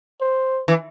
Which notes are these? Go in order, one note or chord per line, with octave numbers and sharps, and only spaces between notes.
C5
E3